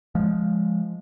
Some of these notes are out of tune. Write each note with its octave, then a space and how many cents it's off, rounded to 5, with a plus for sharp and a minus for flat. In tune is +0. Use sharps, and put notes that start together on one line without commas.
F3 -5 G#3 +0